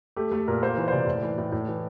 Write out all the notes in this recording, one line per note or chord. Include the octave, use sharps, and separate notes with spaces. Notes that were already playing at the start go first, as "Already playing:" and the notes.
A3 G4
A3 A4
A#2 A#4
A#3 C5
E3
C5
C3 D5
A2
E3
A2
A2
E3